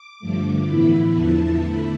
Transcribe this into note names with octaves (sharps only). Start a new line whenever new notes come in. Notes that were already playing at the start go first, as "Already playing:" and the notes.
Already playing: D6
G2 D3 F3 A3
A2 E3 B3 E4 B5
E2 D3 F3 B3 E4 A5
D3 A3 E4 B5